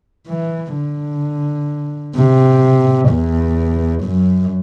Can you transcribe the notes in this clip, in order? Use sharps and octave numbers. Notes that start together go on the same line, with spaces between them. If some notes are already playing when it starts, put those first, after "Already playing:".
E3
D3
C3
E2
F#2